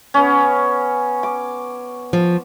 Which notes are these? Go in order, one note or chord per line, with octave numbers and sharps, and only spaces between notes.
B3 C#4
D6
F3